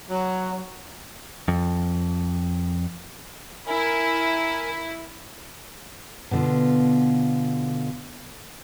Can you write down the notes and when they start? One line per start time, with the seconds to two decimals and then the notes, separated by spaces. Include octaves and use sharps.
0.09 F#3
1.48 F2
3.67 E4 A#4 G#5
6.31 B2 D3 F4